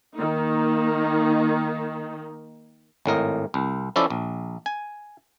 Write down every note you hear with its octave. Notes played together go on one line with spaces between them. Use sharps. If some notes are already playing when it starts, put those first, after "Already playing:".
D#3 A#3 D#4
G#1 A2 A#4 D#5
C2
F3 C#4 E4 A4 D5 E5
A#1
G#5